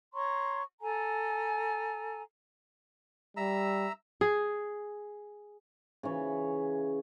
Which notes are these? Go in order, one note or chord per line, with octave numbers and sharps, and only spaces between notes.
C#5 A#5 C6 C#6
A4 G#5 A#5
G3 E5 A#5 E6
G#4
C#3 E3 C#5 B5